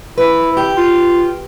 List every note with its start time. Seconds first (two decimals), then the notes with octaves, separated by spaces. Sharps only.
0.18 E4 B4
0.57 G4
0.77 F4